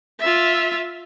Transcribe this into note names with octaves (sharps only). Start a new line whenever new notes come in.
F4 E5